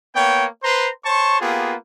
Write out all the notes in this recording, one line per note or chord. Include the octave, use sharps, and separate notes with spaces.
A#3 B3 C#5 G5
B4 C5 A#5 C6
C5 C#5 A5 C#6
A#3 B3 F4 G4 G#4